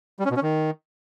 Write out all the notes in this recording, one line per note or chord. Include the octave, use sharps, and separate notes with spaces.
G3
C#4
B2
C#4
D#3